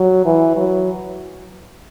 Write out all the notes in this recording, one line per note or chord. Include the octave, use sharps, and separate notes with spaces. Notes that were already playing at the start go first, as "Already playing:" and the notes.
Already playing: F#3
E3
F#3